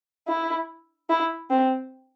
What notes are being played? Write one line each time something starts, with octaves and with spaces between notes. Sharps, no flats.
E4
E4
C4